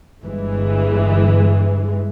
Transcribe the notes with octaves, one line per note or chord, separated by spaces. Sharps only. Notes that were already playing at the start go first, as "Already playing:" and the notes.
G1 G2 E3 G#3